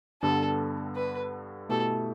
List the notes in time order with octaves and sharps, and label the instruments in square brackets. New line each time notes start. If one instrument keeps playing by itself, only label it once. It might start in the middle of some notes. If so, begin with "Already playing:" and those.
[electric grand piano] G2 D3 G3 B3 [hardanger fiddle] A4
[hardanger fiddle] B4
[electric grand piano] B2 A3 E4 G4 [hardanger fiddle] A4